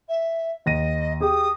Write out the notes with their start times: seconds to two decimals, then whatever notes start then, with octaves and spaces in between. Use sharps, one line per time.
0.08 E5
0.66 D#2 D#5 A#6 D#7
1.21 G4 G#4 D#6